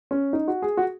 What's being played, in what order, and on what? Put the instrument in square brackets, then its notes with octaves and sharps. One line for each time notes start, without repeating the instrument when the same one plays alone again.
[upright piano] C#4
D#4
F#4
G#4
F#4